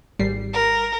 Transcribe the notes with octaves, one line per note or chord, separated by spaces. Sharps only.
G#1 G3 C7
A#4